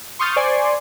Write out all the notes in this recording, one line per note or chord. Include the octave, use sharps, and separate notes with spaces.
C6 C#6 D#6 F6 G6 A6
C5 D5 G#5 C6 C#6